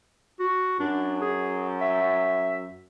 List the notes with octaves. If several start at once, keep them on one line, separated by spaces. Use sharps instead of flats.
F#4
F#2 D4
G#4
E5